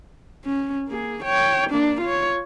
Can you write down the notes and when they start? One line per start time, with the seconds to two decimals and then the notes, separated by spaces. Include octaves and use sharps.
0.45 C#4
0.88 A#3 G#4
1.23 C#5 G5
1.70 A#3 D4
2.01 F4 C#5